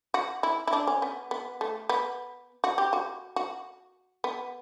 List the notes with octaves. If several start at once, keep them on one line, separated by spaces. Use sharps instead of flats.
F#4
E4
E4
D4
C#4
B3
B3
A3
B3
F#4
G4
F#4
F#4
B3